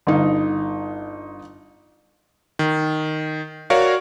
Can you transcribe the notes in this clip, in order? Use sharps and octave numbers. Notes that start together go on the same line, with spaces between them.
G1 D#4 F5
D#3
F#4 A#4 C#5 D5 F5